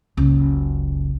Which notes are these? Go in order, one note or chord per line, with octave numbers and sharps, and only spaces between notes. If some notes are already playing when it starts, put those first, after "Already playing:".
F#1 C#2